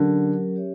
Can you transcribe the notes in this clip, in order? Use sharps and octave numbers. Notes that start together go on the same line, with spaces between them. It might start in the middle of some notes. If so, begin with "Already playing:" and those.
Already playing: D3 F#3 C#4 G4 A#4
C#4 G4 C#5 E5